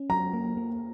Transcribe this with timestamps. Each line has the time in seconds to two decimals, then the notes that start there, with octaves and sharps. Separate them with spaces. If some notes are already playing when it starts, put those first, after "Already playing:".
Already playing: C#4
0.10 F#3 A#5
0.34 A#3
0.57 A#3